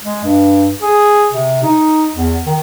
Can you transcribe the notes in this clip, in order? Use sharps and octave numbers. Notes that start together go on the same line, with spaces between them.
G#3
G2
G#4
C3
D#4
E2
D#3